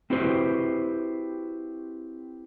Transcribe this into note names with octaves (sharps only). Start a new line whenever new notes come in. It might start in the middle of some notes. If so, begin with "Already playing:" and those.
C4 E4 F#4 G4 B4 C5